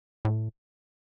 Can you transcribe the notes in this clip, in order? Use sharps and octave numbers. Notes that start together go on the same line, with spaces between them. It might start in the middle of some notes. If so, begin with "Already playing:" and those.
A2